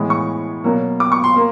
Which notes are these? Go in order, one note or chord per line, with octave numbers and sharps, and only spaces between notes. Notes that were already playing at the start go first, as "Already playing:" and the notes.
Already playing: A2 E3 G#3 B3
C#6
B2 F#3 A#3
D6
C#6
C6
A#3